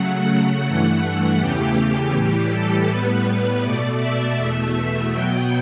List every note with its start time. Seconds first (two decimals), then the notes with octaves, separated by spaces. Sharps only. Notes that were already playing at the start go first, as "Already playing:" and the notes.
Already playing: C#3 F#3 A3 F#5
0.65 G2 E3 A3
1.39 E2 C#3 E3 A3 G4
2.14 A2 E3 G3 G4
2.52 A4
2.88 A2 G3 B3 B4
3.63 B2 A3 D5
4.01 E5
4.37 E2 B2 A3
5.12 B2 F#3 B3 G5